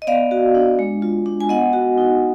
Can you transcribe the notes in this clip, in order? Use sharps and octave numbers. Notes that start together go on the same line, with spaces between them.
D#5
B3 D5 F5
F#4
D4
G#3
F4
D4
G#5
B3 D#5 F#5
F#4
D#4